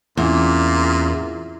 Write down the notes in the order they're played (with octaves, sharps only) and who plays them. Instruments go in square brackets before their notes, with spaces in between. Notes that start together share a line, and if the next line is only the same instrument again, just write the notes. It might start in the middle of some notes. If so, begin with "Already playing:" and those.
[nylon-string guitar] E2 [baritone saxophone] A#2 [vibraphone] C4 C#4 F4